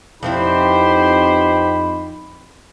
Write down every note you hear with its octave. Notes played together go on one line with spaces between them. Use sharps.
F2 B3 C4 D#4 E4 G4 C5 B5